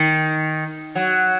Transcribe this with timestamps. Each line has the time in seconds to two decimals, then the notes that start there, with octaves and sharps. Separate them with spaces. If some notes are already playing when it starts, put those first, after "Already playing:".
Already playing: D#3
0.95 F#3